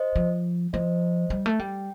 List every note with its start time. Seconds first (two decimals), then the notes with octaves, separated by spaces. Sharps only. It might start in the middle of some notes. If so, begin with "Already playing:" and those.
Already playing: C5 D#5
0.16 F3
0.73 F3 C5 D#5
1.30 G3
1.46 A3
1.59 G3 G5